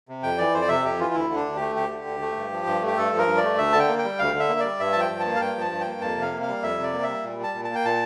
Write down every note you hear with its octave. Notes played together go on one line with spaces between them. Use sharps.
C3
F2 G5
E3 D5
F2 C5
D5
C3 E5
F2 G4
E3 F4
D2 E4
D3
D4
D2
A3 G4
D2 G4
D3
D2
A3
G2
F3
G2
A3
G4
G2 A4
F3
A#4
G2
D5
A3
D2 E5
D3 A5
G5
A#3
G5
G3
D2 F5
D3
E5
A#3
G3 D5
G2 E5
A5
F3 G5
G2
A5
A#3
F5
G2 G5
F3 A5
G2
G5
A#3
F2 A5
C3
F5
A#3
F5
G3
F2 E5
C3 D5
A#3
G3 E5
A#2
G3
A5
A#2
A5
A#3
G5
A#2 A5